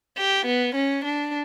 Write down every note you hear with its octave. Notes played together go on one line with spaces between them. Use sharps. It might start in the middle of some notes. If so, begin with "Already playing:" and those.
G4
B3
C#4
D4